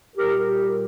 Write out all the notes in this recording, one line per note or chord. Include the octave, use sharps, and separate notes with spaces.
A#2 G3 G4 A#4
G4 A#4